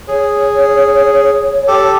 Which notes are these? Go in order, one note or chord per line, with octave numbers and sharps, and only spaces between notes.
G#4 C#5
G4 A4